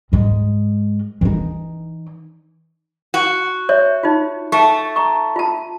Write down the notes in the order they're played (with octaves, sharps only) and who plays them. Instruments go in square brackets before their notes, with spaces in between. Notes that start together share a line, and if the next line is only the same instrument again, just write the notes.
[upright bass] G#2 G#3
E3 D#4
[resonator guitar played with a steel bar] F#4
[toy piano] C#5 E5
D#4 F4
[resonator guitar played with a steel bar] A3 [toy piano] C#6
[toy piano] A#5 C#6
F4 A5